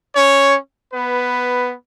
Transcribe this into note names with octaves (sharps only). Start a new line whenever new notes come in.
C#4 C#5
B3 B4